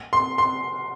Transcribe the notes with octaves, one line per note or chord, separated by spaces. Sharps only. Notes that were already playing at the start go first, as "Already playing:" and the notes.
C6
C6